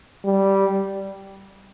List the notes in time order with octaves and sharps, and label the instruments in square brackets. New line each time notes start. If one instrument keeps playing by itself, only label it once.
[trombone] G3